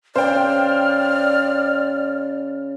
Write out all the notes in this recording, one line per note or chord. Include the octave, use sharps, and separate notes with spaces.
C#3 C5 D5 G5 F6